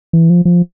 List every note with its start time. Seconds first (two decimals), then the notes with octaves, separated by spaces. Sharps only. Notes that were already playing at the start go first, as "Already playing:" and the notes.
0.13 E3
0.30 F3
0.45 F3